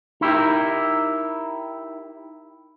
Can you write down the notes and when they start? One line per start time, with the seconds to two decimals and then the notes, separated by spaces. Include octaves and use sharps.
0.21 D#4 E4 G4 A#4